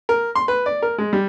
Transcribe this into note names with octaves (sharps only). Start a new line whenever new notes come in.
A#4
C6
B4
D5
A#4
G#3
G3